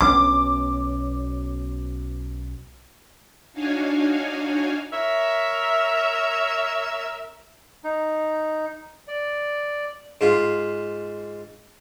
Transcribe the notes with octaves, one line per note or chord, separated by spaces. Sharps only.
B1 B3 C#4 D6
D4 D#4 F#4 C#5 F5 G#5
A#4 C#5 E5
D#4
D5
G#2 F4